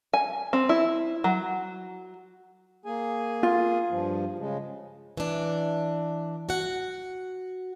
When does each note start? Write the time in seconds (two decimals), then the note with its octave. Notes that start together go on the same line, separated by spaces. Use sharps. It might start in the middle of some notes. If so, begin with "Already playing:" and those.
0.13 G#5
0.53 C4
0.69 E4
1.24 F#3
2.85 A#3 G#4 G#5
3.43 F4
3.90 G2 F3
4.38 C#3 G#3
5.17 E3 D4
6.49 F#4 F#5